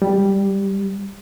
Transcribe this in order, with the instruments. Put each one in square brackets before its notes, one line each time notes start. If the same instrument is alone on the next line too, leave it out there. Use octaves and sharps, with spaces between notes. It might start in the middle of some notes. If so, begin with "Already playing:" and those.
[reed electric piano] G3